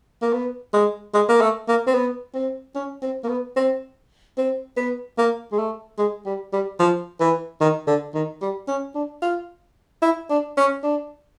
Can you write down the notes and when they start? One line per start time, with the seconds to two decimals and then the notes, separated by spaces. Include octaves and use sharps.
0.22 A#3
0.33 B3
0.73 G#3
1.14 G#3
1.29 A#3
1.41 A3
1.68 A#3
1.87 C4
1.94 B3
2.35 C4
2.75 C#4
3.03 C4
3.24 A#3
3.29 B3
3.56 C4
4.38 C4
4.77 B3
5.18 A#3
5.52 G#3
5.59 A3
5.98 G#3
6.26 G3
6.53 G3
6.80 F3
7.20 E3
7.61 D#3
7.87 D3
8.14 D#3
8.41 G3
8.68 C#4
8.95 D4
9.22 F4
10.02 E4
10.30 D4
10.57 C#4
10.83 D4